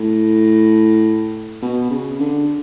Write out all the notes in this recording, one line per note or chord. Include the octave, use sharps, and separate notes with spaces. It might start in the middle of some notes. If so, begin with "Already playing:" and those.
Already playing: A2
B2
C#3
D3